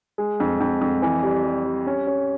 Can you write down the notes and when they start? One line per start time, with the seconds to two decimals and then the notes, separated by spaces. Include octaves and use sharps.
0.18 G#3
0.40 F2
0.60 F2
0.81 F2
1.02 E3
1.23 G3
1.44 G3
1.65 G3
1.87 C#4
2.07 C#4